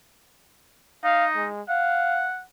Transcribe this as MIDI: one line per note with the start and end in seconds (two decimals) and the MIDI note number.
1.04 1.46 63
1.04 1.26 77
1.36 1.62 56
1.69 2.28 77
1.69 2.41 78